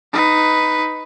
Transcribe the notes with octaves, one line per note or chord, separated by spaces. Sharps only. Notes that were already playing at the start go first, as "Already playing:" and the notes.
D#4 B4